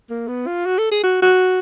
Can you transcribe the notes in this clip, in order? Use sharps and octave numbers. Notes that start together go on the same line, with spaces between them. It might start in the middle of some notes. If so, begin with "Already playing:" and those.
A#3
B3
F4
F#4
A4
G#4
F#4
F#4